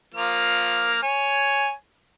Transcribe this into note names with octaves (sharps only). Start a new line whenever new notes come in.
F3 A#3 F6
C#5 G#5